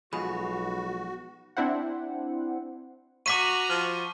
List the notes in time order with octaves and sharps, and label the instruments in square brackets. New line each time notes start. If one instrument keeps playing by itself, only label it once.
[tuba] B1 [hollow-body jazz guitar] F3 G#3 G#4 [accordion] F#4 [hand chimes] B5
[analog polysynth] C4 D4 E4 C5 F#5
[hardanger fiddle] F#4 A#5 [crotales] C#6 [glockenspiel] D6 B6 D#7
[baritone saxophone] F3 [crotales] F6